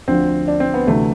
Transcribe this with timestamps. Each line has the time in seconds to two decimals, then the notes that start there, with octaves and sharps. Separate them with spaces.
0.08 D2 D3 F3 C4
0.48 D4
0.60 C4
0.74 B3
0.87 D2 C3 E3 A3